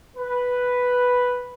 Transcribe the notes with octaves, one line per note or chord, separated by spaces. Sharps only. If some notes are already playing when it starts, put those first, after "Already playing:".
B4